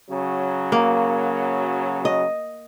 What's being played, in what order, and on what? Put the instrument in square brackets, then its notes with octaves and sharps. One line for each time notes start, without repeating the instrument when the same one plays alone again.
[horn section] C#3 F#3
[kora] A#3
D#5